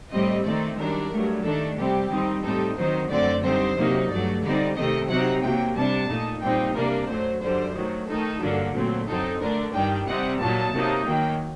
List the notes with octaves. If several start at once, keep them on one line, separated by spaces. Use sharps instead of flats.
A2 G3 C4 D#5
D#3 A3 C4 D#4 D5
F#2 D#3 G3 D4 A#4
G2 F#3 A3
D#3 A3 D4 A4
C3 G3 C4 G4
D#3 G3 C4 D#4
A2 G3 C4 D#4 A4
D#3 F#3 C4 D#4 C5
F#2 D3 F#3 A3 C4 D5
D3 G3 C4 D#4 C5
C3 F#3 A#3 D#4
G2 F#3 A3 D5
D3 G3 C4 D#4 D5
C3 D#3 A3 C4 D#5
C3 F#3 C4 D#4 F#5
C3 F#3 A#3 G5
C3 G3 D4 A5
A#2 A3 D#4
A#2 G3 C4 D#4 G5
C3 G3 A#3 D4 A#4
F#2 F#3 A3 C5
F#2 D3 G3 C5
D#3 F#3 A3
D#3 A3 D#4 A4
G2 D3 F#3 A#3 D4
A#2 F#3 A3 C4
F#2 F#3 C4 D#4 A4
F#2 D3 A3 D4 A#4
G2 D#3 G3 D4 G5
C3 G3 C4 D#4 F#5
A#2 F#3 A#3 D#4 A5
C3 F#3 A#3 D#4
D#3 F#3 A#3 G5